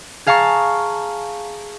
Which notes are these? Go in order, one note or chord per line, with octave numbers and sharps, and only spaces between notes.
G#4 F5 A5 A#5 C#6